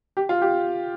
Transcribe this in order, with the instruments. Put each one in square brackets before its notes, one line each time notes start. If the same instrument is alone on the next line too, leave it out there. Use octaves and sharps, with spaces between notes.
[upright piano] G4
F4
G4